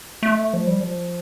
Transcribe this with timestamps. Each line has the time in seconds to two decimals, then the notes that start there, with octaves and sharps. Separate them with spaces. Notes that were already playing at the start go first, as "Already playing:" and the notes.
0.23 A3
0.54 F3
0.67 G3
0.81 F3